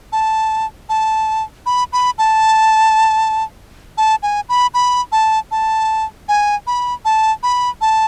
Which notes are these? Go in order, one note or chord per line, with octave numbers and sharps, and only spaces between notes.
A5
A5
B5
B5
A5
A5
G#5
B5
B5
A5
A5
G#5
B5
A5
B5
A5